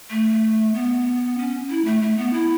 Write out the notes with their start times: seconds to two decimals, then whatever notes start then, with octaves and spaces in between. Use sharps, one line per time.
0.10 A3
0.74 B3
1.38 C#4
1.70 E4
1.85 A3
2.02 A3
2.17 B3
2.33 E4